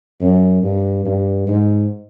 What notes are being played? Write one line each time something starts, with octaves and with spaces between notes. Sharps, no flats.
F#2
G2
G2
G#2